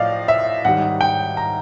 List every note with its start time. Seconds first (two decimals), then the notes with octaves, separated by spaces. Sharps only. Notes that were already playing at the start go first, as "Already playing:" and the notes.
Already playing: A2 F3 D5 D#5 F5
0.28 E5
0.65 G#2 D#3 G3 F#5
1.01 G5
1.37 A#5